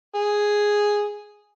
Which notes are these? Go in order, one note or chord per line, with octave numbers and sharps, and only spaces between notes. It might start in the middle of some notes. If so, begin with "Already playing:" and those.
G#4